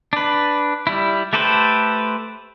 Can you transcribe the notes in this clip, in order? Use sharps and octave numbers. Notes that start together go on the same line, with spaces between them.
D4 B4
G3 E4
A3 G4 A4 B4 C5